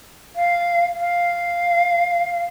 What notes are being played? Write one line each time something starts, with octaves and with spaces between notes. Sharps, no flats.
F5
F5